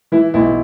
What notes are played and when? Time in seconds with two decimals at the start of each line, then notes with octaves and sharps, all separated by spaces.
0.12 E3 E4
0.34 B1 E4